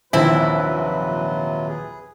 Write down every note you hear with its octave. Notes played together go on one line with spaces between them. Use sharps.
A#1 D#2 C3 F#3 C4 E4 F4 B4
G#4